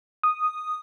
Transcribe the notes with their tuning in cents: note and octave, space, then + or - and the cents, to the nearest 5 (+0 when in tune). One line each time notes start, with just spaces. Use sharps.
D#6 -5